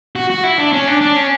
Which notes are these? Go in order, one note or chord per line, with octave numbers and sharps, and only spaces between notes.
F#4
F#4
E4
D4
C#4
D4
D4
C#4